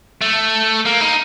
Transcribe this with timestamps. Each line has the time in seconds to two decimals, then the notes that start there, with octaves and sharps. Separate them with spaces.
0.21 A3
0.86 A#3
1.01 D#4